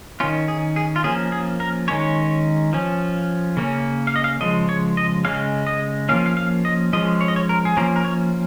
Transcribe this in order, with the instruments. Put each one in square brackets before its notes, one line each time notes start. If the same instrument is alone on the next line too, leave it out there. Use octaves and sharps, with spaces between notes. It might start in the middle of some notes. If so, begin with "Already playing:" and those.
[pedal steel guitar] D#3 C#4 F4
G#4
G#4
F4
F3 A#3 C#4 G#4
G#4
A#4
D#3 G#3 C#4 C#5
F3 C#4
C#3 A#3 C#4
F5
D#5
F5
C#3 F3 G#3 D#5
C#5
D#5
C#3 G#3 C#4 F5
D#5
F3 A#3 C#4 F5
F5
F5
D#5
F3 G#3 C#4 D#5
C#5
D#5
C#5
A#4
G#4
F3 A#3 C#4 A#4
A#4
C#5